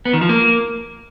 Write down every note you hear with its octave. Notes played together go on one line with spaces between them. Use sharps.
B3
D#3
F3
A#3